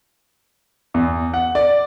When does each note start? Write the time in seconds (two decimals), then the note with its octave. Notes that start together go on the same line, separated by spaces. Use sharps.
0.94 E2
1.34 F#5
1.55 D5